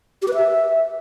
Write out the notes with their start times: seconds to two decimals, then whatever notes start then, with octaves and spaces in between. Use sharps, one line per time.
0.22 G4
0.28 B4
0.34 E5